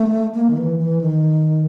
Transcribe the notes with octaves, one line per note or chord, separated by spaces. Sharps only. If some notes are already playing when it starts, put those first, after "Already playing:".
Already playing: A3
A#3
D#3
E3
E3
D#3